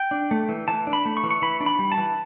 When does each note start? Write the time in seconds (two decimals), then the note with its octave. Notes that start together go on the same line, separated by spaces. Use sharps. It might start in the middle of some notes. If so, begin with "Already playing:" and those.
Already playing: G5
0.11 D4
0.31 A3
0.49 E3
0.68 E3 A5
0.87 D4
0.93 B5
1.05 A3
1.17 C#6
1.24 E3
1.31 C#6
1.42 E3 B5
1.61 D4
1.66 B5
1.79 G3
1.92 A5
1.97 E3